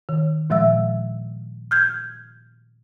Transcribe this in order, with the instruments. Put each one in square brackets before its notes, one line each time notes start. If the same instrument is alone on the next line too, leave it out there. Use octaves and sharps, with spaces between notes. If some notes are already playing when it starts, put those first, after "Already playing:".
[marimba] D#3
A#2 F3 G#3 E5 E6
F6 G6 G#6